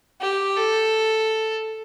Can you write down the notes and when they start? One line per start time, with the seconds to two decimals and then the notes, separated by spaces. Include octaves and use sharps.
0.21 G4
0.57 A4